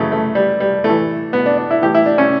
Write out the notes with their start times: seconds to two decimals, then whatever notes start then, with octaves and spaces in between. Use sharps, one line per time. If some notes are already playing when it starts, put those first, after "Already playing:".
Already playing: F#2 C#3 E3 A3
0.12 A3
0.35 G3
0.60 G3
0.84 A2 A3
0.89 E3
1.33 B3
1.46 D4
1.58 D4
1.71 E4
1.82 A2 E3 G4
1.94 E4
2.06 D4
2.18 C#4